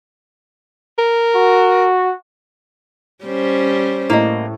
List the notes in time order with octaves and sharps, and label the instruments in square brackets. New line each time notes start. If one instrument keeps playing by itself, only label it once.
[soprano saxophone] A#4
[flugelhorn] F#4
[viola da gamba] G3 C#4 C5
[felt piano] A2 [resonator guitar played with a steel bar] A#3 D#5